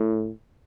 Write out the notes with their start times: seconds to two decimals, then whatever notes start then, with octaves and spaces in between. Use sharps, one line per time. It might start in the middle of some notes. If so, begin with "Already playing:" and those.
Already playing: A2